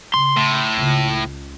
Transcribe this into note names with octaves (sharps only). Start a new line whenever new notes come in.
C#3 C6
A2
C#2 C#3